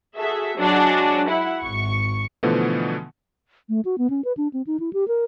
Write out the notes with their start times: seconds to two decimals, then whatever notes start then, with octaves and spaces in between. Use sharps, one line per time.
0.18 F#4 G#4 A4 E5
0.57 F#3 G#3 D4 F#4
1.29 E4 F#5
1.62 G#1 C#6
2.43 B2 D3 E3 F3 A3 B3
3.69 A3
3.85 F#4
3.98 B3
4.10 C#4
4.25 B4
4.37 D4
4.53 C4
4.67 D#4
4.80 E4
4.93 G4
5.08 A#4